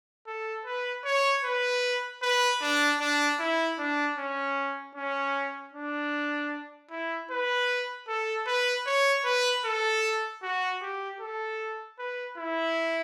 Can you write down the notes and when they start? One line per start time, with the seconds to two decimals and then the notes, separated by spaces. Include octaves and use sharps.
0.27 A4
0.66 B4
1.05 C#5
1.44 B4
2.22 B4
2.61 D4
3.00 D4
3.39 E4
3.79 D4
4.18 C#4
4.95 C#4
5.73 D4
6.91 E4
7.30 B4
8.08 A4
8.47 B4
8.86 C#5
9.25 B4
9.65 A4
10.43 F#4
10.82 G4
11.20 A4
11.99 B4
12.37 E4